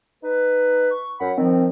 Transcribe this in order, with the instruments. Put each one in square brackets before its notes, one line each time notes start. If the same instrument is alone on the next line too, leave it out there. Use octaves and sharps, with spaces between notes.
[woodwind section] D#4 B4
[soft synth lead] C#6
[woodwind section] F#2 B5 [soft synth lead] F#5
[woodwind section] D#3 F3 [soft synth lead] C4